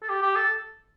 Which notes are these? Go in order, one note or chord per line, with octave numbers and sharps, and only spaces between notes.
A4
G4
G4
A4